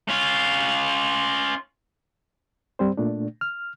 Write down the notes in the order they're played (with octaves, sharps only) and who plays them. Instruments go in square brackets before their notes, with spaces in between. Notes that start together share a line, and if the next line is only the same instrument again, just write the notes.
[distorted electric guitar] C#4 F4
[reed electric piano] G2 G3 C4 C5
A#2 A3 D4
F6